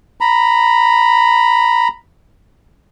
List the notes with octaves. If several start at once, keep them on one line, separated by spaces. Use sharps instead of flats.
A#5 B5